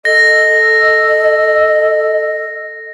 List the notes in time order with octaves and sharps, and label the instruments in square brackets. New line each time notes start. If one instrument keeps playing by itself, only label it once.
[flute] A4 [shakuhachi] D#5 [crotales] A#6